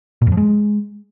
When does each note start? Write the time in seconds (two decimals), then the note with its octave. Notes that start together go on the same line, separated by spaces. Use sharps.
0.22 A#2
0.27 F2
0.32 F3
0.37 G#3